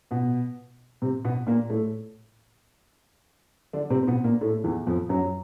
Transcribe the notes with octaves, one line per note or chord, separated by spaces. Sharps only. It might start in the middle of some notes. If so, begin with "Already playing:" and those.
B2 B3
C3 C4
B2 B3
A#2 A#3
A2 A3
D3 D4
C3 C4
C4
B2 B3
A#2 A#3
A2 A3
E2 E3
F2 F3
F#2 F#3